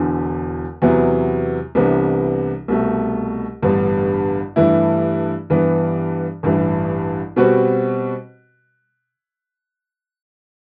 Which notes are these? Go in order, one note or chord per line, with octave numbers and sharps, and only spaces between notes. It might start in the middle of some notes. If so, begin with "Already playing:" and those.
Already playing: E1 E2 D3
E2 C3 F#3 B3 E4
C2 C3 E3 B3 D4
C2 B2 A3
A1 G2 D3 G3 B3
G2 E3 A3 E4
G2 E3 B3
A1 G2 E3
B2 G3 C4 F#4 B4